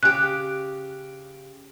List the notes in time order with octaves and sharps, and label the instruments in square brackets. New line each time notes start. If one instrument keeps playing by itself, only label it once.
[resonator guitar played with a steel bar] C#3 G4 [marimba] F#6